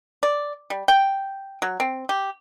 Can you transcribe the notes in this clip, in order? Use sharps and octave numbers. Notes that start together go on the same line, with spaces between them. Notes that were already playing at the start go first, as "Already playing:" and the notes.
D5
G3
G5
F#3
C4
G4